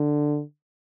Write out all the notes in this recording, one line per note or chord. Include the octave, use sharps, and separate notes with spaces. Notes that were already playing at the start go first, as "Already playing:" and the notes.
Already playing: D3